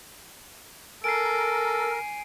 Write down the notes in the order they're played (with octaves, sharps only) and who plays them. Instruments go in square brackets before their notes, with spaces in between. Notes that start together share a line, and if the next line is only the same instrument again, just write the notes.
[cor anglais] A4 [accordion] A#4 [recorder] G#5 [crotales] C7 D7